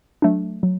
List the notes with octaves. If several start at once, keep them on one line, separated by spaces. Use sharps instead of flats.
F#3 A3 D4
F#3